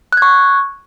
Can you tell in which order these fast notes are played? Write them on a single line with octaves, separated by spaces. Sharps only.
F#6 G#6 C#6